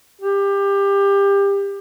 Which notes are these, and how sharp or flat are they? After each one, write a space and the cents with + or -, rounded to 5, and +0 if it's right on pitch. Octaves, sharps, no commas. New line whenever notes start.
G4 +25